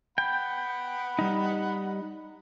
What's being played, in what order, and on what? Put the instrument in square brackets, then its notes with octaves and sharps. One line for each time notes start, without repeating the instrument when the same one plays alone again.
[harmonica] F#5 B5 [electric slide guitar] G5
[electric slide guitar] G3 D#4